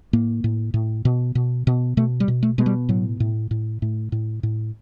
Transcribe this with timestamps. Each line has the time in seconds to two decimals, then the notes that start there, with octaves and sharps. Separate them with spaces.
0.13 A2 A#3
0.44 A2
0.74 A2
1.05 B2
1.35 B2
1.67 B2
1.97 B2 A3
2.20 G3
2.28 B2
2.43 A3
2.58 B2 G#3
2.66 G3
2.89 A2 F#3
3.20 A2
3.51 A2
3.82 A2
4.12 A2
4.43 A2